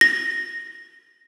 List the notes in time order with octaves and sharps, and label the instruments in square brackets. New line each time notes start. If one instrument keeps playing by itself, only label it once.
[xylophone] A#6